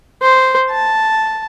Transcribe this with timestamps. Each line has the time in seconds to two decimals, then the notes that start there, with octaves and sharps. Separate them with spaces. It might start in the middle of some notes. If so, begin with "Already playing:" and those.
0.22 C5
0.70 A5